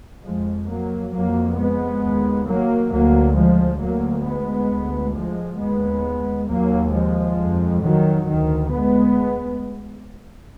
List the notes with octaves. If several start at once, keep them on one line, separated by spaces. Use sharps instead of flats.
F2 F3 G#3
F#3 A#3
F2 F#3 A#3
G#3 B3
D#2
F#3 A#3
D2 F#3 A#3
F3 G#3
D2 F#3 A#3
G#3 B3
D2
F3 G#3
D#2 G#3 B3
D#2 F#3 A#3
F3 G#3
F2
D#3 F#3
D2 D#3
G#3 B3